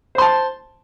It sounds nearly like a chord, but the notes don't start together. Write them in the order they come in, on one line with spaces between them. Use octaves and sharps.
C5 C6 A5